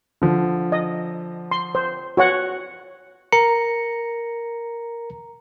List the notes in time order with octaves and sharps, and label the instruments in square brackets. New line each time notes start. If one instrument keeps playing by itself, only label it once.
[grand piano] D3 F3
[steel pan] D#5
C6
C5
F#4 C#5 F#5
[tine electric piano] A#4 A#5 C#7